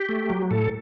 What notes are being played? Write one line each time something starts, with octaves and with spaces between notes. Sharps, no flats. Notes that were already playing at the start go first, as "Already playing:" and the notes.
Already playing: G4
A3
F#3
A2 A4